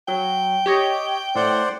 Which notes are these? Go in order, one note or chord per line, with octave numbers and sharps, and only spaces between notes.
F#3 G5
G4 C#5 D#5
A2 C5 D5 F#5